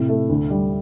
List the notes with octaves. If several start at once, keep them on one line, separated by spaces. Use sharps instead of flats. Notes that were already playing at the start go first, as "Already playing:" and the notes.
Already playing: A2 C3
A3
D2
G3